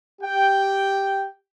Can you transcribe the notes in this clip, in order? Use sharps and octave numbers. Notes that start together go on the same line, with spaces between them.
G4 G5